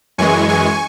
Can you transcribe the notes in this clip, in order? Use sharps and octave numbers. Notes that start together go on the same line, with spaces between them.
F#2 E3 G#3 G#5 C#6
G#5 C#6